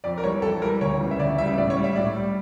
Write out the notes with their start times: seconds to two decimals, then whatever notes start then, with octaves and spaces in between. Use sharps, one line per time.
0.04 F2 D5
0.18 A#4
0.24 E3 G3 C#5
0.42 F2 A4
0.62 E3 G3 A#4
0.81 D2 C#5
1.00 C#3 E3 G3
1.11 E5
1.20 D2 D5
1.38 C#3 E3 G3 E5
1.57 A2 D5
1.70 C#5
1.77 G3
1.84 E5
1.96 A2 D5
2.16 G3